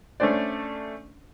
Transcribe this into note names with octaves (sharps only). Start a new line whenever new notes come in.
A3 C#4 D4 C5 D5